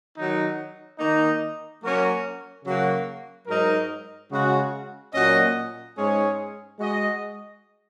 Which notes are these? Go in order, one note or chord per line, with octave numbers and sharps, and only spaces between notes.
D#3 F#3 D#4
D#3 A#3 D#4
F#3 A#3 C#4 F#4 A#4
C#3 F#3 A#3 F#4
G#2 F#3 D#4 A#4
C#3 G#3 F#4
A#2 F#3 C#4 F#4 D#5
G#2 G#3 C#4 G#4 C#5
G#3 F#4 D#5